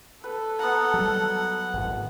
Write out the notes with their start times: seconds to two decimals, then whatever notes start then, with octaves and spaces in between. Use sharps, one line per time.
0.24 A4 B4
0.59 B3 F5 F#5 A#5
0.94 F#3 G3
1.73 G#1 A2